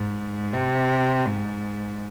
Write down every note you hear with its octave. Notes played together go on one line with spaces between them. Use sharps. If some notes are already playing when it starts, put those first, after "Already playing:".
Already playing: G#2
C3
G#2